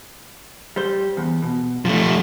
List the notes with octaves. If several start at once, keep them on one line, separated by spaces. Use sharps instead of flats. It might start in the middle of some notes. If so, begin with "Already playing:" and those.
G3 C5
E2
B2
C3 F3 A3